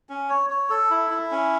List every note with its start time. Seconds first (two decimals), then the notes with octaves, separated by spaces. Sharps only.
0.09 C#4
0.29 C#5
0.50 C#5
0.70 A4
0.91 E4
1.10 E4
1.31 C#4